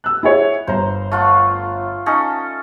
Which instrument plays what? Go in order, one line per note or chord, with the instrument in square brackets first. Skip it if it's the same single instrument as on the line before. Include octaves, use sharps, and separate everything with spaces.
[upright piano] E6 F#6
E4 G#4 C#5
[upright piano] G1 A#5 [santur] C5
[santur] A3 F4 F#5
C#4 D#4 A4